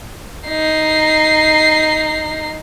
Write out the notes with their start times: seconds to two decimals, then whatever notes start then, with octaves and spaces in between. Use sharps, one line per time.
0.48 D#4 C7